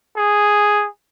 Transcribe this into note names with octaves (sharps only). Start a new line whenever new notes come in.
G#4